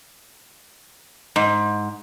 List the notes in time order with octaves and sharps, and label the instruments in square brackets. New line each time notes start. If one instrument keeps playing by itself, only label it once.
[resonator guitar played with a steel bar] G#2